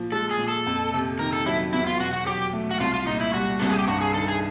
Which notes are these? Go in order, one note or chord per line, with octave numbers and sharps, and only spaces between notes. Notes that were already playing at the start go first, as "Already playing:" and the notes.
Already playing: A#2 F3
G#3 A4
G#4
A#2
A4
F2
C3
D#3 A#4
A4
F#3 E4
E2 E4
F4
B2 F#4
F#4
F#3 G4
A3
F#4
C2 F4
F4
A#2 D#4
E4
G3 F#4
C2 A4
G#4
G4
G2 F#4
G#4
D#3 A4
G#4